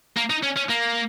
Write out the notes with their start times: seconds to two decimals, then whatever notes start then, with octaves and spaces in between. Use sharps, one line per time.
0.17 A#3
0.30 D#4
0.43 C#4
0.56 C#4
0.69 A#3